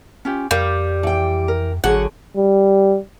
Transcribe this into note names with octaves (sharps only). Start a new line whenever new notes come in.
C#4 F4 G4
F2 G3 A#4 F5
E3 G5
A#4
G#1 D3 F#3 F#4 G#4 F#5
G3